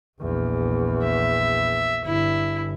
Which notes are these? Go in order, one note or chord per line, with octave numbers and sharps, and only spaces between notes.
A#1 E2
E5
G1 E4